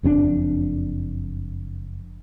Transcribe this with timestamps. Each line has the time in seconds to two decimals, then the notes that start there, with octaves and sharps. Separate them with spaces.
0.03 F#1 F2 A2 D4